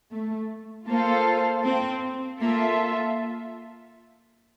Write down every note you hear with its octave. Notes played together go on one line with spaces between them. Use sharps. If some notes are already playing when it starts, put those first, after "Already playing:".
A3
A#3 F4 A4 C5 F5
C4
A#3 F4 A4 E5